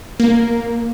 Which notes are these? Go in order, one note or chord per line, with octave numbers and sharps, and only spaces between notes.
A#3